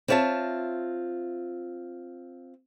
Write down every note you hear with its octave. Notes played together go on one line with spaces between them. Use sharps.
C4 E4 F4 C#5 E5 A5